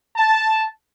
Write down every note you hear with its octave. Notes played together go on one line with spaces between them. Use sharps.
A5